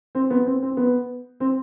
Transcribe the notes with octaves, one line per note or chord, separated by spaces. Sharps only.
C4
B3
C4
C4
B3
C4